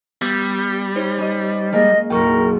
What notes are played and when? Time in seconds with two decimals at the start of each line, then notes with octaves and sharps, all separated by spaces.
0.22 G3 B3
0.96 D#4 C5 C#5
1.18 C#4 D#5
1.72 G#3 A#3 C#4 D#5
2.10 F#1 B1 A#4 G5 C#6